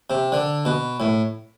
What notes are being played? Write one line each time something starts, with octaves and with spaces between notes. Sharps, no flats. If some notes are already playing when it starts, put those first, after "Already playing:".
C3
D3
B2
A2